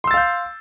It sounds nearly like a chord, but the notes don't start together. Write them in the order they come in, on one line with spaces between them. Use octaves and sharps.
C6 E6 A6 F5 G6